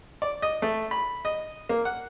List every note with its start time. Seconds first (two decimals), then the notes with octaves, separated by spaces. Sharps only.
0.22 D5
0.42 D#5
0.62 A3
0.91 B5
1.25 D#5
1.69 A#3
1.85 F#5